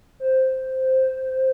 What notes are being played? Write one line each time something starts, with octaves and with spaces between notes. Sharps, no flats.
C5